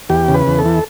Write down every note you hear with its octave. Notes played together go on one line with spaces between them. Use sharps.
E2 G4
C#3
B4
E2
A4
E3